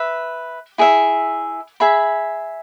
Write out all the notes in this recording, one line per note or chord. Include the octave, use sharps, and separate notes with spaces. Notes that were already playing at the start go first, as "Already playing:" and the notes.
Already playing: B4 E5
E4 G#4 E5
G#4 E5 B5